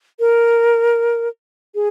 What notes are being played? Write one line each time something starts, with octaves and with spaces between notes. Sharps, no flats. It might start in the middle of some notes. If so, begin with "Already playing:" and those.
A#4
G#4